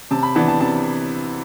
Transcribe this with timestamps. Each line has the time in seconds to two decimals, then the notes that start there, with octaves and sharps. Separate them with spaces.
0.11 C3 A5
0.23 B5
0.35 E3 B3 D4 A5
0.48 A5
0.60 C3 A5